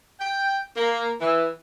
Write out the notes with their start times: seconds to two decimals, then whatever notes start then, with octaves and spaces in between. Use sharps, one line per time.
0.20 G5
0.76 A#3
1.21 E3